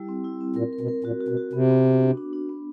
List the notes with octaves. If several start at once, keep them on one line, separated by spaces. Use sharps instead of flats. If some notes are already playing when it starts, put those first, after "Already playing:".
Already playing: G3 E4 G4
C4
E4
C4
A#2 A#4
A#4
B2
A#4
A#2 F#4
F#4
B2
F#4
C3 B3
B3
B3
D4
D4
D4
B3